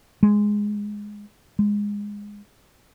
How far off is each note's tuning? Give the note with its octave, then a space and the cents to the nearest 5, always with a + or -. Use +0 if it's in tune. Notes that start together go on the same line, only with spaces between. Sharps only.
G#3 +0
G#3 -15